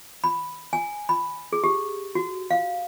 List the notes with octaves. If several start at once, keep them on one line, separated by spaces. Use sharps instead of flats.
B5
G#5
B5
G#4
G4
F#4
F5